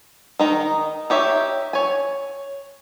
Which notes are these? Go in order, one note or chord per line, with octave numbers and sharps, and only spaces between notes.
D#3 D#4 A#5
D#4 G4 C#5 E5
C#5 G#5